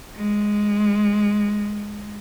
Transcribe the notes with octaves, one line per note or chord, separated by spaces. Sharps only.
G#3